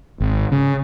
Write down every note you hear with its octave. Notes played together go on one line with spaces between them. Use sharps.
G#1
C#3